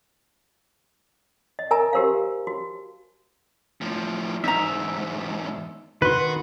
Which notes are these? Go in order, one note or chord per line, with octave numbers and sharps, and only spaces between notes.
D#5
A#4 E5 G#5 A#5
F#4 G4 A#4 C5 F5
F#4
A2 F3
E2 G#2 D#4 E5 A#5
D#3 F#4 B4 C6